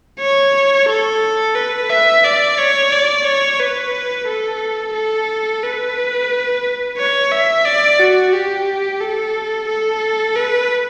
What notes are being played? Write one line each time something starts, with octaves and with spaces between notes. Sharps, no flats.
C#5
A4
B4
E5
D5
C#5
D5
C#5
B4
A4
A4
B4
C#5
E5
D5
F#4
G4
A4
A4
B4